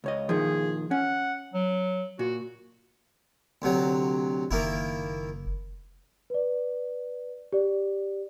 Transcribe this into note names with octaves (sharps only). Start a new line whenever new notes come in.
C#2 C#5 D#5
A#2 D#3 F3 G#4
C#4 F#5
F#3
A#2 F#4
D2 C3 F#3
F#1 D#3 A#3 E4
B4 D5
G4 D5